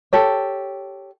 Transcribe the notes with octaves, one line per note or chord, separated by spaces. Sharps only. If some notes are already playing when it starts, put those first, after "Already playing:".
G4 A4 C#5